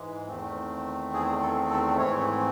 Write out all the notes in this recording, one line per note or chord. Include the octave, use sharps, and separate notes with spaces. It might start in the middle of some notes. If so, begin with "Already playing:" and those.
Already playing: G#2 E3 G#3
E2 D#3 A3 C4
G#4
A4
A4
G#2 E3 A3 C4 C#5